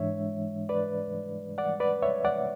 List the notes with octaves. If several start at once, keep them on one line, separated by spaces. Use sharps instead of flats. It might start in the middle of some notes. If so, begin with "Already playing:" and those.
Already playing: G#2 E3 G#3 D4 C#5 E5
B4 D5
D5 F#5
B4 D5
C#5 E5
D5 F#5